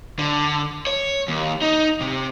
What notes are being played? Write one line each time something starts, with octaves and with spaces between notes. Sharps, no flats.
D3
C#5
D#2
D#4
C3